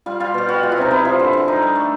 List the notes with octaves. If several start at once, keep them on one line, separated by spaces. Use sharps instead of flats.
G3 F4
G3 F4
B2 G4
G3 F#4
G#3 F4
E4
C3 D#4
C3 E4
F3
D3
D3
G3 D#4
G3
A3